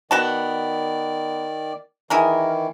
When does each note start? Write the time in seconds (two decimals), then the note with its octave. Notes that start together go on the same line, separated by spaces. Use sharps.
0.11 D#3 B3 F#4 D5 A5
2.10 D#3 E3 E4 G#4 A#4